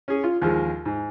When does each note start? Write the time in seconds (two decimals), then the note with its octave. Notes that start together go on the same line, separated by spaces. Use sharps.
0.08 C#4 G#4
0.24 F4
0.42 D#2 F3 G#3
0.85 G#2